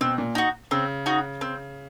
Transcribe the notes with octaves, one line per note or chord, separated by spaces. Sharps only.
B2 C4
A#2
D#4 F#4
C#3 C4
D#4 F#4
C4